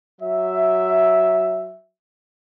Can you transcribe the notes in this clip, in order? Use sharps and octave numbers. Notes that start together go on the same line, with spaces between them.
F#3 E5